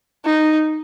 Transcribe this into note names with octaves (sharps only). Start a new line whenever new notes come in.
D#4